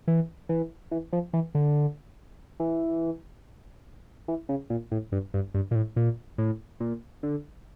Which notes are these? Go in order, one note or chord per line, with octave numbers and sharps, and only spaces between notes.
E3
E3
E3
F3
E3
D3
E3
E3
C#3
A#2
A2
G2
G2
G2
A#2
A2
A#2
A2
A#2
D3